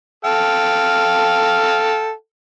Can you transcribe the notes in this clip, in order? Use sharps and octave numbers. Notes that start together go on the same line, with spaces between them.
A4 F5 G5